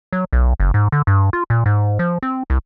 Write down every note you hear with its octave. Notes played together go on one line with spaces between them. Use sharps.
F#3
B1
F#1
G#2
D3
G2
F4
A#2
G#2
F3
C4
C2